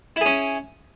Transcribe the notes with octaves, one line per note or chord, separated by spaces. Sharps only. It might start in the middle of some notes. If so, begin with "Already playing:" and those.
C#4 E4 G#4